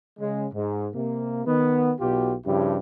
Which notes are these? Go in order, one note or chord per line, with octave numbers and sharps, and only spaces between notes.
C#3 G#3
G#2
C3 A#3
D#3 B3
B1 B2 F4 G4
G2 C#3 F3 E4 G4